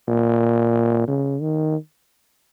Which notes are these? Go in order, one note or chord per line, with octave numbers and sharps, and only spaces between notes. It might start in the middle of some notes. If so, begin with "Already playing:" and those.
A#2
C#3
D#3